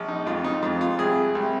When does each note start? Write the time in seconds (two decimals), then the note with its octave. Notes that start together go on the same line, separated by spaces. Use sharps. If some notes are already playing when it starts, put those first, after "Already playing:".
Already playing: A#1
0.08 D#4
0.26 F2 F4
0.44 D#4
0.62 F2 F4
0.81 F4
0.99 C2 G#4
1.35 C2